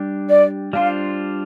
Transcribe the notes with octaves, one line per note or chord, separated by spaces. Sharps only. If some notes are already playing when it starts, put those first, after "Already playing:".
Already playing: G3 D4 G4
D5
G3 D4 F4 C5 F5